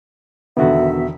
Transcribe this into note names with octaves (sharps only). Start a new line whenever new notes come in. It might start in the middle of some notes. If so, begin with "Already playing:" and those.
E1 D3 D#3 B3 F#4 E5